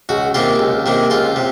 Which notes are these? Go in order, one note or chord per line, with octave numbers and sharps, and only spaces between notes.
C#2 F#4
C3 D#3 A#3 F4
C#2
C3 D#3 A#3
C#2 F4
C3